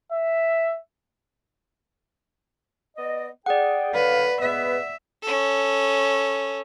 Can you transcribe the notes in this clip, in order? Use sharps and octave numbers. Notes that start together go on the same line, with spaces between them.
E5
B3 D5 D#5
G#4 D5 F#5 G5
D3 B4 C#5 F5
G#3 B3 B4 E5
C#4 A4